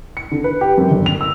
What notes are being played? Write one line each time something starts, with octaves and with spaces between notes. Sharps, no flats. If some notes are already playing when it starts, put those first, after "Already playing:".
C#7
D3
B4
G4
F#2
G1
F7
E6